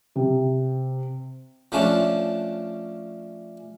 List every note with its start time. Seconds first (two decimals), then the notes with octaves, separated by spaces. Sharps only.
0.16 C3
1.72 F3 A3 C#4 D4